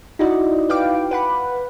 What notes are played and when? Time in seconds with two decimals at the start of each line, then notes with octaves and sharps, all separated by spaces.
0.19 D#4 E4 F#4 D5 D#5
0.69 B4 F5 G5 D6
1.11 B4 F#5 B5